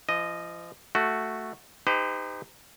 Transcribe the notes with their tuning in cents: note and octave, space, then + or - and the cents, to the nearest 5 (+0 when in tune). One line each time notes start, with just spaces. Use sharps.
F3 -40 D#5 -5
A3 +0 F#4 +0
D#4 +0 G4 +25 C5 -45